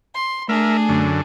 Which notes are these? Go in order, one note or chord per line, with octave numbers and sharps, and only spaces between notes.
C6
A3 D4 G#4 A#4 E5
F#2 D3